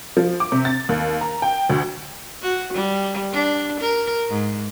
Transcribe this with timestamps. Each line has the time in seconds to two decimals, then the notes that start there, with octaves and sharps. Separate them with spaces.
0.17 F3
0.40 D6
0.52 C3
0.65 A6
0.89 D#2
1.21 A#5
1.42 G5
1.69 D2
2.42 F#4
2.73 G3
3.32 D4
3.80 A#4
4.30 G#2